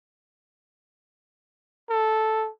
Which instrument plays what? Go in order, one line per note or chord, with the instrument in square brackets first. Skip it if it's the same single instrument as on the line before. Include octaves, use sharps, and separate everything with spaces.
[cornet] A4